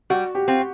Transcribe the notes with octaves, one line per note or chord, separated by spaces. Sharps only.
G3 F#4
G4
C4 F4